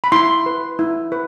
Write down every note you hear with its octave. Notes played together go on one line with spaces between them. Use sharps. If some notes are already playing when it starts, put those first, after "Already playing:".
B5
E4 C6
B4
E4
B4